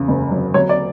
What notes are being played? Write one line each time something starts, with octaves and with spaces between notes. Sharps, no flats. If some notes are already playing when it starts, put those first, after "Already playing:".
Already playing: E2 C#3
F#1
F#3
F#3 C#5
D5